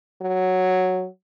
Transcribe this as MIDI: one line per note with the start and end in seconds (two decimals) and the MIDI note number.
0.22 1.06 54